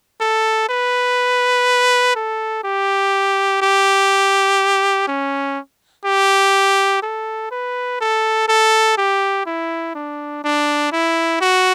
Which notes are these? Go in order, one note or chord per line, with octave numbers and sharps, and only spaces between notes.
A4
B4
A4
G4
G4
C#4
G4
A4
B4
A4
A4
G4
E4
D4
D4
E4
F#4